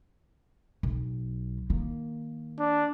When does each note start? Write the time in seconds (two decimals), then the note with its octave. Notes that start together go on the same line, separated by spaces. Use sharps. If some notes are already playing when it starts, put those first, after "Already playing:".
0.83 B1
1.70 D#3 A#3
2.60 D4